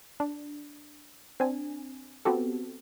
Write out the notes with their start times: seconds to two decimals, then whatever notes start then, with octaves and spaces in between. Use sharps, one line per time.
0.20 D4
1.40 C4 D4 G#5
2.25 B3 C4 F#4 G4 A4